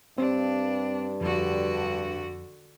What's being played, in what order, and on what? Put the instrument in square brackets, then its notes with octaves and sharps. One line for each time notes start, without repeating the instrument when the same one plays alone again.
[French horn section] G2 [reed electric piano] C4 [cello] D4
[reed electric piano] F2 [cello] D3 F#4